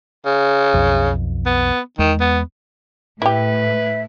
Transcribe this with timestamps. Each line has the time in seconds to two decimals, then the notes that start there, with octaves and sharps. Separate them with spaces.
0.26 C#3
0.74 B1 F2
1.46 B3
1.99 E2 D#3 G#3
2.20 B3
3.22 A2 E4 G4 B4 E5